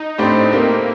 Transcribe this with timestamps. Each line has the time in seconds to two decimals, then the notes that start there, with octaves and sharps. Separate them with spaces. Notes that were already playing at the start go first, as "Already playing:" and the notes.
Already playing: D#4
0.18 A2 A3 C4 D4 G4 C5
0.51 A3 A#3 C4 G4 A#4